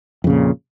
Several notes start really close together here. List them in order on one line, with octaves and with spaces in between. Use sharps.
F2 C#3 A#2